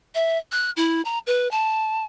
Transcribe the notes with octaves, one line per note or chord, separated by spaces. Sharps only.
E5
F#6
E4
A#5
B4
A5